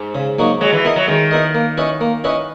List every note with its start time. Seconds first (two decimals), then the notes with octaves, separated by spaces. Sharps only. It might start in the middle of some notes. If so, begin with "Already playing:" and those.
Already playing: G#2
0.15 C#3
0.39 F#3 A#3 D#4 F#4
0.61 F#3 G#3
0.73 E3
0.85 B3 E4 A#4 D#5
0.96 F#3
1.08 D#3 G#3
1.31 B3 E4 A#4 D#5
1.55 A#3
1.77 C#4 E4 B4 D#5
2.01 A#3
2.24 C#4 E4 B4 D#5